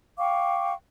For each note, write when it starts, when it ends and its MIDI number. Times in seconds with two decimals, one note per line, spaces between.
0.18 0.73 77
0.18 0.73 79
0.18 0.73 85
0.18 0.73 86